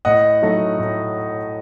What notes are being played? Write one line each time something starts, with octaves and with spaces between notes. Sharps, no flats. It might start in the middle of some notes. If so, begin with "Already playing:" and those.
A2 D#5 F#5
F#3 A3 D#4
A2